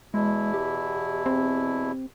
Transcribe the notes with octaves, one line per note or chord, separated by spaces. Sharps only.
E2 B2 G#3 E4
G4
C4